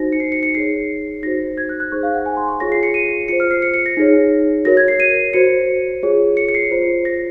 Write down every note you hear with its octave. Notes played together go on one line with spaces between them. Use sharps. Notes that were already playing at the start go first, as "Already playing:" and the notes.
Already playing: D#4 F#4 C5 A#6
C#7
C7
C#7
C#7
D#4 G#4 C#5 C7
D#4 F#4 C5 A#6
G#6
F#6
F#6
D#4 G#4 C5 C#6
F5
F#5
G#5
C6
C#6
F4 G#4 C#5 A#6
C7
C#7
D#7
F4 C5 C#7
F6
C7
C#7
C#7
A#6
D#4 G#4 C#5
F#4 A#4 C#5 A#6
G#6
C7
D#7
F#4 C5 C#7
F4 G#4 C#5
C#7
C#7
C7
F4 C5
A#6